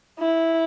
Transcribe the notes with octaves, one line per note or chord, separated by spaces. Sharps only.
E4